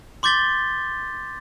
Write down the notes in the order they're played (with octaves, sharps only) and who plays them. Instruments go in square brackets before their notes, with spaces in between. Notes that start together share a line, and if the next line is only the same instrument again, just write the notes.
[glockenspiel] C6 D6 G6 A6 B6 G7